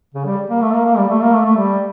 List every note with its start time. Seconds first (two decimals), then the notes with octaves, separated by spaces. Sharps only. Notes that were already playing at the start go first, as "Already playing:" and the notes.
0.14 C#3
0.26 G3
0.50 A#3
0.61 A3
0.73 A#3
0.85 A#3
0.98 G3
1.09 A3
1.21 A#3
1.33 A3
1.45 A3
1.57 G3